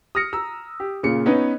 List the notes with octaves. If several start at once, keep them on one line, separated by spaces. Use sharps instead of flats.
D#6 F6 A#6 C#7
A#5 E6
G4
A#2 C#3 C#7
B3 C#4 D#4 B4 C#5